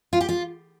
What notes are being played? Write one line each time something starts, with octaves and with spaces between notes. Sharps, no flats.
F4
G4
F4